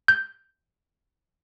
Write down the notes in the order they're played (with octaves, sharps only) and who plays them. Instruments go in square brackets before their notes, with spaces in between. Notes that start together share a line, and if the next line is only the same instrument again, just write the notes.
[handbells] G6